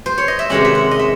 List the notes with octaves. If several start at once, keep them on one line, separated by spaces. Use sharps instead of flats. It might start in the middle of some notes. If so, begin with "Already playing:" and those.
C5
C#5
D#5
E5
C3 D#3 G#3 C#4 F#5
E5
F#5
D#5
E5